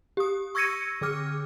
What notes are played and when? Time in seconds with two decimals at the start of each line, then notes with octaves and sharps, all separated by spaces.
0.17 G4 D#6
0.55 C#6 E6 G#6 A#6 C#7 D#7
1.01 D3 G#4 D6 F6